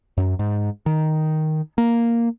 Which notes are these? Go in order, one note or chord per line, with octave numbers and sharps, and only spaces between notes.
F#2
G#2
D#3
A#3